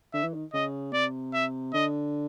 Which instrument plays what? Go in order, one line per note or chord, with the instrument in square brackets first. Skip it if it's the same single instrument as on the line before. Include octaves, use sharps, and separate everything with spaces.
[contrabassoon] D3 [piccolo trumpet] E5
[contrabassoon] E3
D#3
[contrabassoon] C#3 [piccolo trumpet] D#5
[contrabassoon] C3 [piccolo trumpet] D5
[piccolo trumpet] E5
[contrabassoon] D3 [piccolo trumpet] D#5